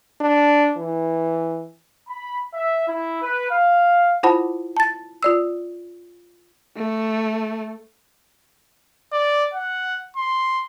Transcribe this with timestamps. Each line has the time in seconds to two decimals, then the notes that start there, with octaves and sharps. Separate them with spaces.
0.21 D4
0.77 E3
2.08 B5
2.54 E5
2.87 E4
3.22 B4
3.50 F5
4.23 E4 F4 C5 F#5 A5 B5
4.77 A5 A6
5.23 F4 D5 E6
6.76 A3
9.13 D5
9.54 F#5
10.16 C6